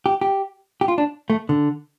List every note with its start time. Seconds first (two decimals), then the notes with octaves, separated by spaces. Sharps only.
0.06 G4
0.21 G4
0.81 G4
0.88 F4
0.98 D4
1.30 A3
1.49 D3